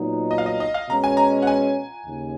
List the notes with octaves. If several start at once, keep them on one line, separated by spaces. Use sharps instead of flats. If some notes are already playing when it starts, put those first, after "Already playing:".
Already playing: A#2 F#3 B3 D#4
D#5
F5
D#5
D#5
F5
B2 G#3 C#4 A#5
G#5
A#5
F#5
G#5
D#2 C#3